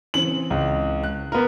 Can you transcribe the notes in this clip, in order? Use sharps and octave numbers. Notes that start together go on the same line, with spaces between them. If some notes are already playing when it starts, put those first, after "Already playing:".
C#3 E3 C4 F#7
C#2
F#6
B3 A#4